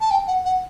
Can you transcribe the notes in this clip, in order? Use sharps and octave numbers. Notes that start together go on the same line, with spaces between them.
A5
G5
F#5
F#5